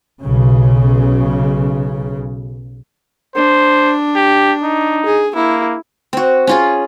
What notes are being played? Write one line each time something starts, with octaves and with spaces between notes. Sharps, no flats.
B1 C#3
D4 C5
G4
D#4
G#4
A#3 E4
C4 F#4
C#4 F4 G#4